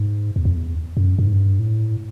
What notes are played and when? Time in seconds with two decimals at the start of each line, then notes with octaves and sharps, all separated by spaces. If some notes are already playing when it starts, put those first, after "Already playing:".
Already playing: G#2
0.36 E2
0.45 F2
0.56 E2
0.97 F#2
1.19 G2
1.26 G#2
1.33 G2
1.59 A2